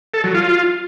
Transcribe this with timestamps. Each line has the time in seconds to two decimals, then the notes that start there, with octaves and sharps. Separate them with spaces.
0.14 A4
0.24 F#3
0.34 F4